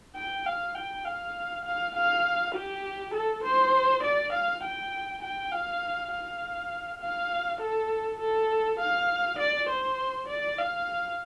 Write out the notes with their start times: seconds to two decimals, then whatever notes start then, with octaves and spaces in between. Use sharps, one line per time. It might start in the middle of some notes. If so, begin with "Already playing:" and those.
0.16 G5
0.46 F5
0.75 G5
1.05 F5
1.65 F5
1.94 F5
2.55 G4
3.14 A4
3.44 C5
4.03 D5
4.32 F5
4.63 G5
5.22 G5
5.52 F5
6.11 F5
7.01 F5
7.61 A4
8.20 A4
8.80 F5
9.39 D5
9.69 C5
10.28 D5
10.58 F5